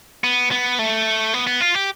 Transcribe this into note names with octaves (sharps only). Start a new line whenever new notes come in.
B3
B3
A3
B3
B3
F4
G4